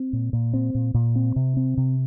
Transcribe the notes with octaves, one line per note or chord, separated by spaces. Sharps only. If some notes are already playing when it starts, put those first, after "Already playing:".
Already playing: C4
A#2
A#2
C4
A#2
A#2
C4
C3
C4
C3